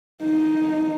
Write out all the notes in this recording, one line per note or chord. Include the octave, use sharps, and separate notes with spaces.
D#4